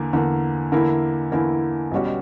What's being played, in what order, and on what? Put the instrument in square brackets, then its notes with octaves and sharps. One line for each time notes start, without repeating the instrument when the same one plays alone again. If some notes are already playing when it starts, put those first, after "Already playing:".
Already playing: [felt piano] E2 D3 A#3
E2 D3 A#3
E2 D3 A#3 E4 A#4
E2 D3 A#3 E4 A#4
B1 B2 G3 C#4 F#4